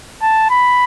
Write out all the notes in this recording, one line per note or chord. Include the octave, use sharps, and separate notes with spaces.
A5
B5